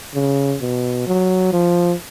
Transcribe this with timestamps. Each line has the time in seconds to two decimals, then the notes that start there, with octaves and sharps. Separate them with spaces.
0.14 C#3
0.61 B2
1.07 F#3
1.53 F3